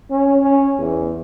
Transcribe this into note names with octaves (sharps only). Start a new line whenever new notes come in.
C#4
C#4
E2